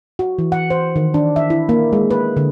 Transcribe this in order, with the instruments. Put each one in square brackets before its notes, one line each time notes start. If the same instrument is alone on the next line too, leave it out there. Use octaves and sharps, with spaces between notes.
[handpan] F#4
E3
F#5
C5
D#3
D4
E5
E4
A#3
G#3
B4
D3